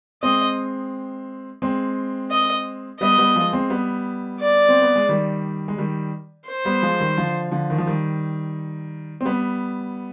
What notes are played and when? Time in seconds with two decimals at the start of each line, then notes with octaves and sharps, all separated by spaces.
0.23 G#3 C4 D#5
1.62 G#3 C4
2.31 D#5
3.01 G3 B3 D#5
3.18 G3 B3
3.36 F3 G#3
3.53 G#3 C4
3.70 G3 B3
4.39 D5
4.69 C4
4.82 B3
4.96 G#3
5.09 D#3 G3
5.68 G#3
5.78 D#3 G3
6.48 C5
6.65 G3 B3
6.82 F3 G#3
7.00 D#3 G3
7.18 D3 F3
7.51 D3 F3
7.70 D#3
7.78 F3
7.87 D#3 G3
9.21 C4
9.25 G3 B3